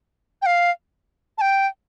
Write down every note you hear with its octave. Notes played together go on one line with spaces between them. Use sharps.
G5
F5
A5
G5